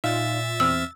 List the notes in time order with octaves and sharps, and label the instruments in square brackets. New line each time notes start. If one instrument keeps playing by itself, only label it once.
[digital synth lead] A#2 [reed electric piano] D#4 F5 [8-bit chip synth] E5 A6
[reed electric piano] E2 C4 F6 [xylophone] E6